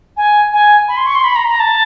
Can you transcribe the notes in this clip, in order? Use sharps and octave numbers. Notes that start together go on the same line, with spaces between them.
G#5
G#5
B5
C6
C#6
C6
B5
A#5
A#5
A5